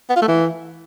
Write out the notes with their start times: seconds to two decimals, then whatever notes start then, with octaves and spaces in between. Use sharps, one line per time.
0.10 B3
0.16 F4
0.22 A3
0.28 E3